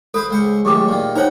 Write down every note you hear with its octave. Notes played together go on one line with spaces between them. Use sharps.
A4 B4 C5 B5
C#2 C5 C#6
F#2 A2 D#3 G4 G#4 D6
A#2 D#3
D#4 A#4 C5 C#5 F#5 G5